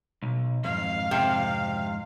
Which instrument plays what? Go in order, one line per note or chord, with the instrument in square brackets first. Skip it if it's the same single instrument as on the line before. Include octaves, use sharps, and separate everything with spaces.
[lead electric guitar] B1
[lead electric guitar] F2 G#2 [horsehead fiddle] F5
[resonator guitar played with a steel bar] C3